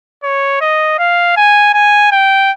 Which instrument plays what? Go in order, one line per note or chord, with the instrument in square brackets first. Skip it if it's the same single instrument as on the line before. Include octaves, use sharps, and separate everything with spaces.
[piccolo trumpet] C#5
D#5
F5
G#5
G#5
G5